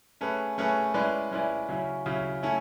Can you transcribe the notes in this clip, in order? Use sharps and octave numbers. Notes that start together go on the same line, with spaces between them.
A3 C#4 G#4 B4
A3 C#4 G#4 B4
G#3 C#4 E4 B4 D5
G#3 C#4 E4 B4 D5
C#3 F#3 C#4 E4
C#3 F#3 C#4 E4
A3 C#4 E4